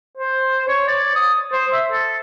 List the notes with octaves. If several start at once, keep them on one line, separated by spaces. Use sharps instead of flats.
C5
C#5
D5
D#6
C5
E5
A4